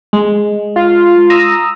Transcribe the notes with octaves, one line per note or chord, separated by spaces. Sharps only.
G#3
F4
A#5 D#6 E6